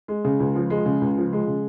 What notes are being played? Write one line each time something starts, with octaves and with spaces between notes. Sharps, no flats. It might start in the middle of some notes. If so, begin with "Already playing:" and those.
G#3
C#3
C#2
F3
G#3
C#3
C#2
F3
G#3
C#3